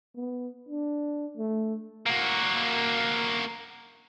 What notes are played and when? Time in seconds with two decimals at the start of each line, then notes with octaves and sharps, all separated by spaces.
0.16 B3
0.69 D4
1.37 A3
2.06 A#3 F#4